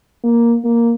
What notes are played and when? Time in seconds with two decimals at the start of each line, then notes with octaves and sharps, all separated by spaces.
0.24 A#3
0.65 A#3